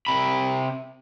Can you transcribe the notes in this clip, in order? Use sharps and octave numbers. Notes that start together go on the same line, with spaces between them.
C3 B5